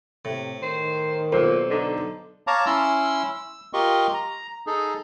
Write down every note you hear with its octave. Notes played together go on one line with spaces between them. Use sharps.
A2 C3
D#3 C5
B1 A#2 C5
D3 D#4
C#5 F5 A5 A#5 D6
C#4 E4 C6 E6
E6
F4 G4 A#4 D#5 C6 C#6
A#5
D#4 G#4 A4